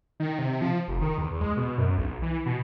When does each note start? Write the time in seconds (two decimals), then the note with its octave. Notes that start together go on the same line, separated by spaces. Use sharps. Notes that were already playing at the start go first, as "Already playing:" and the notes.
0.20 D#3
0.39 C3
0.61 F3
0.88 F1
1.01 D#3
1.18 E2
1.41 G#3
1.57 B2
1.78 F#2
1.98 B1
2.22 E3
2.46 B2